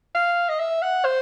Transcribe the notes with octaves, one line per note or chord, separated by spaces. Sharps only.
F5
D#5
E5
F#5
C5